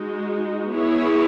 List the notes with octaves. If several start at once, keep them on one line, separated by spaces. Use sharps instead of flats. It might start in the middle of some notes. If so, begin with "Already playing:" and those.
Already playing: G#3 D#4 F#4
B3 E4 G#4 C#5